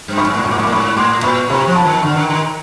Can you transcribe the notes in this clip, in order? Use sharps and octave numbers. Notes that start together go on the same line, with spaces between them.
G2
B5 C#6
G#2
A2
G#2 C#6
A2 D6
G#2 C#6
A2 D6
G#2 B5 C#6
A2 C6 D6
A#2 B5 C#6
C3 B5 C#6
F3
A5 B5
D#3
D3 B5 C#6
D#3
D#3 A#5 C6